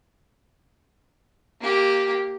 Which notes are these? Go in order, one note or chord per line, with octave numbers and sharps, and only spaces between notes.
A#3 G4